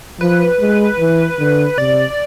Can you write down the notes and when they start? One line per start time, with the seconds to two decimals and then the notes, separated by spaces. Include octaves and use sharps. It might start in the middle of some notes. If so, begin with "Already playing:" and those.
0.20 F3 B4
0.60 G#3
0.99 E3
1.39 D3
1.78 C3 D5